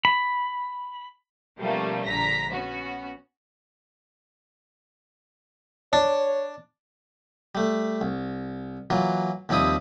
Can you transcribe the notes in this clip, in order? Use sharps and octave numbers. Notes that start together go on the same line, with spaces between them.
B5
B2 F3 G3 A3 A#3 C#4
A#1 D3 A#5 A#6 B6
B3 C#4 F#4
D4 C#5
G3 A3
C2
E3 F#3 A#3 F4
D#2 F3 G3 C4 E4 D#6